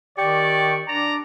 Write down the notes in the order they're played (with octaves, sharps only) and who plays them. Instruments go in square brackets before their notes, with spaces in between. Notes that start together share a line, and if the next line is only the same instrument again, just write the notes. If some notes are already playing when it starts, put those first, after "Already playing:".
[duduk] D#3 [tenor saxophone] G4 [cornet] D5 [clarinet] C#6
[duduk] D4 [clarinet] D5 [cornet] A#5